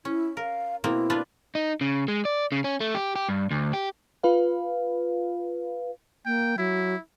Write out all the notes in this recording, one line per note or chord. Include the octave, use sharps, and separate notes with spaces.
C#4 E4
A#4 F5
B2 A#3 C4 E4
D4 F4 B4
D#4
C#3
G#3
D5
C#3
C#4
A3
G4
G4
G2
D2
G4
F4 B4 F5
A#3 G5
F#3 E4